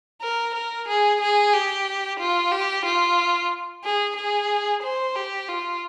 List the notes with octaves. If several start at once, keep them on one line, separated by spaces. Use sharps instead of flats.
A#4
A#4
G#4
G#4
G4
F4
G4
F4
G#4
G#4
C5
G4
F4